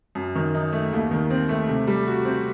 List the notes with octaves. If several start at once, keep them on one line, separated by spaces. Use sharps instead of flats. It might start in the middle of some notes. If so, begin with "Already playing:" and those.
F#2
D#3
D#4
A3
D#2
D#3
C4
A3
C3
G3
F#4
C4